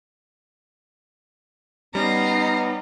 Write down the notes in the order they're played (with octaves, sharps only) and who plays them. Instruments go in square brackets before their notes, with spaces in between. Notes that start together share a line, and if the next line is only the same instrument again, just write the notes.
[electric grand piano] G3 C#4 [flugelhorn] B3 [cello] D#4 [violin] A#5 C7